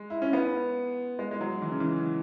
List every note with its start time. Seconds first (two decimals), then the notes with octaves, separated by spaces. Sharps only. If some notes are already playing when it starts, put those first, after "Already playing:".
Already playing: G#3
0.10 E4
0.22 C#4
0.33 B3
1.19 G#3
1.31 G#3
1.41 F#3
1.62 E3
1.72 C#3
1.80 E3